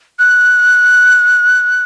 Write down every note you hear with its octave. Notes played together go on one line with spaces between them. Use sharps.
F#6